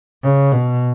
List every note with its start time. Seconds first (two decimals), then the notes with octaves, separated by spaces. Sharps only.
0.23 C#3
0.52 B2